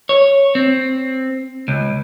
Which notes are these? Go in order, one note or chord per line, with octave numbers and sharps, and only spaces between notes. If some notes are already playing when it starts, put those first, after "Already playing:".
C#5
C4
C#2